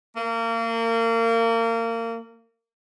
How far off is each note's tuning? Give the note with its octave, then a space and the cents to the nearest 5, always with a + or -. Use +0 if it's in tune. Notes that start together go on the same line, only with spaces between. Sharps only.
A#3 -30